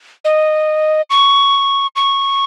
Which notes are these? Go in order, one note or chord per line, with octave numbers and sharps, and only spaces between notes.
D#5
C#6
C#6